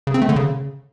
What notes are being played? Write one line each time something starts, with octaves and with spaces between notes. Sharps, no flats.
C#3
C4
A3
D3
C#3